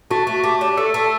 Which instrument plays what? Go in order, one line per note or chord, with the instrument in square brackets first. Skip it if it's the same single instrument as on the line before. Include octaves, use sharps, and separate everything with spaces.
[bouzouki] A3 [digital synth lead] F#4
[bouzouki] A3
[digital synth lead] F#4
[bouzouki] A3 [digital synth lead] G4
[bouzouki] D4
[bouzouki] A3 [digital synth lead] A4
[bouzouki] A3